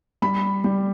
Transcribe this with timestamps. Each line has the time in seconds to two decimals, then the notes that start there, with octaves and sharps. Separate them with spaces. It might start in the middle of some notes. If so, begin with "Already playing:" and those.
0.22 G3 B5
0.64 G3